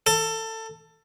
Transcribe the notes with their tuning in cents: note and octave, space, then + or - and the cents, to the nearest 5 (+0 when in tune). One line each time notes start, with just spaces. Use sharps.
A4 +20